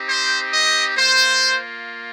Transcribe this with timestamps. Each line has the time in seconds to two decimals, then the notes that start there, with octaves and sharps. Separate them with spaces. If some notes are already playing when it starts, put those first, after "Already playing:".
Already playing: C4 D#4 G4
0.09 C5
0.53 D#5
0.97 A#3 F4 C5